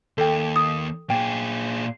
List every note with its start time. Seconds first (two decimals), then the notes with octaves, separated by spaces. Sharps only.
0.18 D#2 A4 G5
0.56 D#6
1.10 A#2 G#4 G5